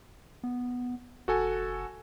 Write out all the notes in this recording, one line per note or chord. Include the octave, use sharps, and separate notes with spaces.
B3
F1 F#4 A4 G#5